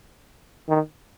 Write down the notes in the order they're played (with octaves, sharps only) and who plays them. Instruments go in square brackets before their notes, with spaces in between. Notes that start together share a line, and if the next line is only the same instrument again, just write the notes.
[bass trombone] D#3